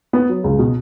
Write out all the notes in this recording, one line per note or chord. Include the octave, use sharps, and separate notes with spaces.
B3
F#3
C#2
B2